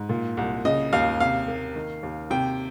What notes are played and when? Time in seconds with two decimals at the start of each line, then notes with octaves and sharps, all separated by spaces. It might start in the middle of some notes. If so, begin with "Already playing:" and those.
Already playing: G#2
0.09 A#2
0.37 C2
0.65 C#3 D#5
0.93 D#2 F5
1.20 C3 F5
1.48 A#3
1.76 D#3
2.03 D#2
2.31 C3 G5